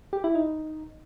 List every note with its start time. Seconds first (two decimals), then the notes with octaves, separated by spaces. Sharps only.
0.13 G4
0.24 E4
0.35 D#4